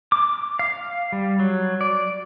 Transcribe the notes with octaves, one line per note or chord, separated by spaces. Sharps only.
D6
F5
G3
F#3
D5